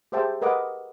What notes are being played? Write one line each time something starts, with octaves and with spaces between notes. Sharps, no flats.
G4 G#4 C5 E5 G5 A5
A#4 B4 D#5 F#5 D6